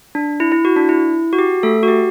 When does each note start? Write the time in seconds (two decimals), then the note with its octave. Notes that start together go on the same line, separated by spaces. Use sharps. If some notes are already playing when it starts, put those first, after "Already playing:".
0.15 D4
0.40 E4
0.52 E4
0.65 F#4
0.76 D4
0.89 E4
1.33 F#4
1.39 G4
1.63 A3 A4
1.83 F#4
1.88 G4